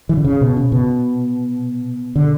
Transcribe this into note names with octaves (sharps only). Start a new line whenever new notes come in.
E3
D3
C#3
B2
C#3
B2
D3